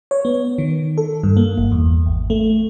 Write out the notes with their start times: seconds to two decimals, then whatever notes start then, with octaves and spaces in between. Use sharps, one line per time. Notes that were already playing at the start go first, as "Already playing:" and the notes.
0.11 C#5
0.25 B3
0.58 D#3
0.98 A4
1.23 G2
1.37 A#3
1.58 G1
1.72 E2
2.06 G#1
2.30 A3